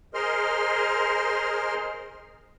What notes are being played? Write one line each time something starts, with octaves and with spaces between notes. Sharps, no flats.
G#4 A#4 C5 D#5 C6 F6